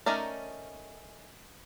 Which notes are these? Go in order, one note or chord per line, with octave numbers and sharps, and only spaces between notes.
A3 C#4 D#4 A#4 D5